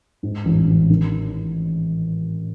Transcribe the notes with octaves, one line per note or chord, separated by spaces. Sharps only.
G#2
A1
A1
D#3